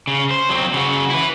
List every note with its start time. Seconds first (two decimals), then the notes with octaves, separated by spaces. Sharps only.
0.07 C#3
0.31 C5
0.49 F#3 C4
0.74 C#3 F#4
1.10 E4 B4